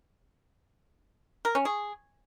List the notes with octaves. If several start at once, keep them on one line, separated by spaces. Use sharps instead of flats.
A#4
C#4
G#4